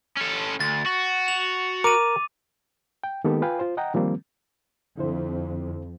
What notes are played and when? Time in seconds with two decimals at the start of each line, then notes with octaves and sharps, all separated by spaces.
0.17 C#4 A4
0.60 D2 A6
0.86 F#4
1.28 F7
1.84 A#4 D6 D#7
3.04 G5
3.24 D#3 G#3 A#3 B3 G4 A4
3.42 F4 B4 F5 G5 G#5
3.59 F4 C5
3.77 D#5 F#5 G5 A#5
3.94 D#3 F3 G3 A#3 C4
4.97 F2 D3 E4 C5